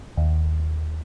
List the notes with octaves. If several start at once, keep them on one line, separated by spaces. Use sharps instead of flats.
D#2